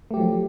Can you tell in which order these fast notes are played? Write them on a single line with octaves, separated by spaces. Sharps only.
A3 G4 F#3 F3